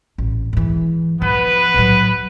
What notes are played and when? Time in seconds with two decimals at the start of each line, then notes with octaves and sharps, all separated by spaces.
0.18 A1
0.53 G#2 E3
1.22 F3 B3 B4
1.74 A2 F#3